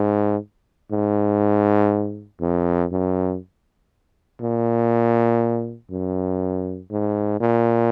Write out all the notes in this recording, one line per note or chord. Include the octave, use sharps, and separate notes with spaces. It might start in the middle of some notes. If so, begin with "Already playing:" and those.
Already playing: G#2
G#2
F2
F#2
A#2
F#2
G#2
A#2